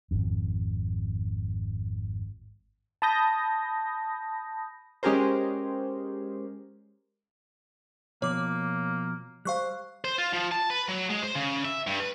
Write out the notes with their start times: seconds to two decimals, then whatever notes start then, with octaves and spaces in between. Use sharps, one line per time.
0.11 G#1 F2
3.02 A5 B5 D#6 G6 A#6
5.03 G#3 C#4 G4 G#4 A#4 C5
8.22 B2 F3 A#3 C#5 D6
9.45 G3 C5 F5 C#6 F#6
10.05 C5
10.18 F4
10.34 F3
10.52 A5
10.70 B4
10.89 F#3
11.10 G#3
11.23 C5
11.35 C#3
11.65 E5
11.87 G2
12.00 B4